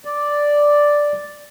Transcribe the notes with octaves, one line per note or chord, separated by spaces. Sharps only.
D5